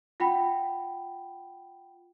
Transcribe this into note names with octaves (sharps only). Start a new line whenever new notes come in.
F4 F#5 G5 B5